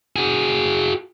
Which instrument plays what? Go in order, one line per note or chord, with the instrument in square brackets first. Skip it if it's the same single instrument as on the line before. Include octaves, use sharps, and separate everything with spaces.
[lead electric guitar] F#4 G#4